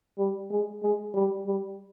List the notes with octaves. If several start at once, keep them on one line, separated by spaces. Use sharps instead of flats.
G3
G#3
G#3
G3
G3